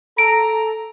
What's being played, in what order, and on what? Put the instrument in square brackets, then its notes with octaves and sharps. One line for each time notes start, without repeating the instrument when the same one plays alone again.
[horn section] A4 A#5 [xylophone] D7